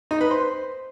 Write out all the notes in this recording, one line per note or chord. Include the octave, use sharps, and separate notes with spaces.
D#4
B4
C5